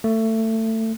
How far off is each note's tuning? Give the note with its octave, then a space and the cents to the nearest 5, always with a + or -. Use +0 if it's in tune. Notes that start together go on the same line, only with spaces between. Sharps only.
A3 +20